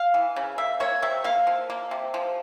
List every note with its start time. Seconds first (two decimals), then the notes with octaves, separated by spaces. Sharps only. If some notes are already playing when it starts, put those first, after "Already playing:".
Already playing: F5
0.14 E3
0.36 C#3
0.58 A#3 E5
0.80 A#3 C#5
1.02 C3 E5
1.24 A#3 F5
1.47 F3
1.70 A#3
1.91 C3
2.14 F3